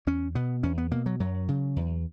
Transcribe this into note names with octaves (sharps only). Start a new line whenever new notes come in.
E2 C#4
B2 B3
E2 C#4
B3
B2 A#3
F#3
F#2 F#3
C#3
E2